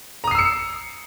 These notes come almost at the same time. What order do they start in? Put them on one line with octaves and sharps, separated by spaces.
A#5 D#6 C7 E6 C#7